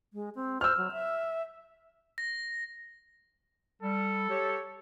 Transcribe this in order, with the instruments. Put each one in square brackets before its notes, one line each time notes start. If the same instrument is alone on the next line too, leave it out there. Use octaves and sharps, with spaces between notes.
[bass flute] G#3
C4
[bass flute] C5 [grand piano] E6 F6
[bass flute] F#3
E5
[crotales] A#6
[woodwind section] G3 [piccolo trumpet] A4
[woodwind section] G4 C#5